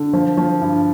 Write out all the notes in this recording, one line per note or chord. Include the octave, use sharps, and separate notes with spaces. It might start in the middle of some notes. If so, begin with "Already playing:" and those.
Already playing: D3
F3
F3
G2